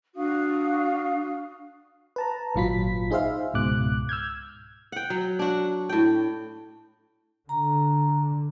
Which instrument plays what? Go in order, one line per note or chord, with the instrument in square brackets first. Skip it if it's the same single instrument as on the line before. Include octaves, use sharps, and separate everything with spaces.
[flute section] D4 F#4 F5 D#6
[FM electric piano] B4 A5 A#5
G#1 A#2 F#3 F4 B5 B6
D#4 G#4 C5 E5 F5
C#2 G#2 B2 D6 F#6
E6 F6 G6 G#6
[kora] F#5 G5
F#3
D4 F#4
A2 G5
[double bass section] D3 [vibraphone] A#5